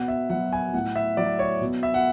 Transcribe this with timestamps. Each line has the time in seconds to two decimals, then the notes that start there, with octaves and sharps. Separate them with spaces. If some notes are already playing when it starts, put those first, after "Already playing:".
Already playing: B2 F#5
0.08 E5
0.30 F#3 F#5
0.53 G#5
0.74 A2 F#5
0.96 E5
1.17 F#3 D5
1.39 C#5
1.61 B2
1.83 E5
1.94 F#5